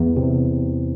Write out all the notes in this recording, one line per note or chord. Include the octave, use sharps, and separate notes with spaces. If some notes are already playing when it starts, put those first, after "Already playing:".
Already playing: E2
C3